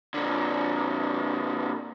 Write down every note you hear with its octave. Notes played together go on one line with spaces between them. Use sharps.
A#2 D3